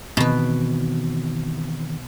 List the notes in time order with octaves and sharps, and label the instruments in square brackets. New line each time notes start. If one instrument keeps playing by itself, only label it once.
[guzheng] B2 B4 [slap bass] D#3 E3 C4